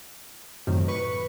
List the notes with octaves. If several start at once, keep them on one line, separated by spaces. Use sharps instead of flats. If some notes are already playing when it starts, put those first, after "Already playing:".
F#2 A2 C3 D#3
B4 C#6